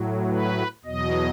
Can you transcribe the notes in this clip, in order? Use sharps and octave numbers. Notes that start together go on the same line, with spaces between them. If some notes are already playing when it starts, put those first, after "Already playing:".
Already playing: A2 F#3
B4
E2 B2 F#3 D#5